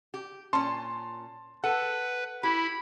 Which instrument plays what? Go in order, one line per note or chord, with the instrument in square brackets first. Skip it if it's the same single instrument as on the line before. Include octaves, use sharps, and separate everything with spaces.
[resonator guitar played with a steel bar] G4
[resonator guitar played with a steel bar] A#2 C#4 [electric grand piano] A5 C6
[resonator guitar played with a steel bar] A4 [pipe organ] B4 [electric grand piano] F#5
[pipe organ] E4 [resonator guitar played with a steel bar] G4 [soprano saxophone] B5